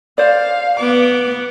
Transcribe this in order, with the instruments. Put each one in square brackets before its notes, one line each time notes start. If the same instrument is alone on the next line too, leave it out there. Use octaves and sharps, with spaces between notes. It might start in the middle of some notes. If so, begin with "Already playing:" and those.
[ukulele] C5 D5 [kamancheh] F5
[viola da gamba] B3 [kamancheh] D6